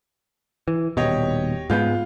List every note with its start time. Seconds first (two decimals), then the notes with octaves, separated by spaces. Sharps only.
0.68 E3
0.97 D#1 B2 G4 C#5 D#5
1.70 G#2 G#3 B3 F4 G6